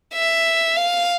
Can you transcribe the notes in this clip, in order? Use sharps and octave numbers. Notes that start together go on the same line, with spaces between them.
E5
F5